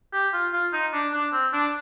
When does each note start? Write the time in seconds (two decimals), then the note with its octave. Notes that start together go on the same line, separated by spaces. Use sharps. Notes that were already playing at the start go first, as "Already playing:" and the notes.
0.13 G4
0.33 F4
0.53 F4
0.73 D#4
0.93 D4
1.13 D4
1.33 C4
1.53 D4